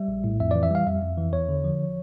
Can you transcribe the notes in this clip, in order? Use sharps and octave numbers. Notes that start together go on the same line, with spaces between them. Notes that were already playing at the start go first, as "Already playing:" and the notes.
Already playing: G3 E5
A#1
A2
F2 E5
E3 D5
E5
G3 F5
F2 E5
F2
E3
E2 C#5
D3
F3